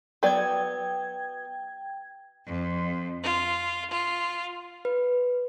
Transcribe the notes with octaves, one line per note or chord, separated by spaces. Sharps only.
F#3 B3 D5 G5 G#6
F2
F4
F4
B4